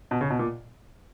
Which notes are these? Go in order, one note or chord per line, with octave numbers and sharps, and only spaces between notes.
B2
C#3
B2
A#2